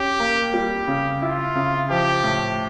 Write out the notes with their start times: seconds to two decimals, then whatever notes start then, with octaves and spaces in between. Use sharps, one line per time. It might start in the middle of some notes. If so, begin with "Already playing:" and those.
Already playing: C#4 G4
0.20 A#3
0.54 G3 G4
0.87 C#3
1.22 E4 F4
1.55 C#3
1.90 F3 G4
2.24 A2